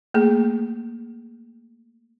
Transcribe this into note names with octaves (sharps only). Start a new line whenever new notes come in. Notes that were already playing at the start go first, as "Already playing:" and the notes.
A3 A#3 G#4